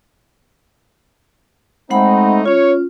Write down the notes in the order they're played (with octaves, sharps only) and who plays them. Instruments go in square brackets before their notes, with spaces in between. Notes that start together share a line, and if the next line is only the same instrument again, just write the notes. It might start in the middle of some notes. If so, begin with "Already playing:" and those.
[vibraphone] G#3 F#5 B5 [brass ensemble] A3 C4 D#4
[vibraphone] C#4 F4 [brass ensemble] C#5